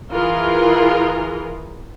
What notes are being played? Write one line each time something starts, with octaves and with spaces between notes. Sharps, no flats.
E3 F4 G#4 A#4